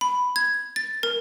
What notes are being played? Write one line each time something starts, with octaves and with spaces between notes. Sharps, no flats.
B5
G#6
A6
A#4